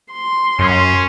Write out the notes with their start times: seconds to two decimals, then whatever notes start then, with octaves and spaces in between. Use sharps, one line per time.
0.12 C6
0.59 F#2 C#4